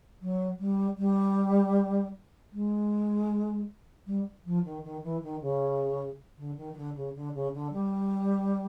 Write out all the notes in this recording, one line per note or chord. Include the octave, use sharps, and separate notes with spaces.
F#3
G3
G3
G#3
G3
F3
D#3
D#3
E3
D#3
C#3
D3
D#3
D#3
D3
C#3
D3
C#3
D3
G3